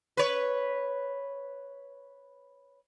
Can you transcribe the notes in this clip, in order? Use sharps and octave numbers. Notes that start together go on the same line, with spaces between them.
B4 C#5